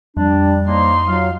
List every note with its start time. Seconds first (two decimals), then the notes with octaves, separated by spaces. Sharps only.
0.17 F2 G3 D4
0.68 C#3 F3 A#3 D#4 C6
1.07 F#3 F4 F5